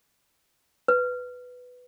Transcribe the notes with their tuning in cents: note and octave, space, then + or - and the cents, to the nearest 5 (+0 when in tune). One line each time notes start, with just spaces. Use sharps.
B4 +5